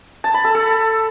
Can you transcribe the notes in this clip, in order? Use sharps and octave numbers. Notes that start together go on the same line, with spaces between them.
A5
B5
A4
A4